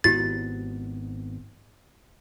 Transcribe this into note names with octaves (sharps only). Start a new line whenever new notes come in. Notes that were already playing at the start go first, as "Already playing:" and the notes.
G#1 G#2 B3 E4 F#4 G4 A6